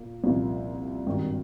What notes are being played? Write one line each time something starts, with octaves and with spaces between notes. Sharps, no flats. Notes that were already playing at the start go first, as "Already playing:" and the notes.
Already playing: A#2 A#3
C2 A#2 F3 A#3
G#1 G2 D#3